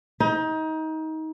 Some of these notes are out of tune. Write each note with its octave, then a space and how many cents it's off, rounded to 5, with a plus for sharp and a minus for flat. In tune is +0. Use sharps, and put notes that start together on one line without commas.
D#4 +25